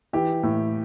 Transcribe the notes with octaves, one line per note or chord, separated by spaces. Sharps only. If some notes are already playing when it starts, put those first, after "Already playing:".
E3 G4
A2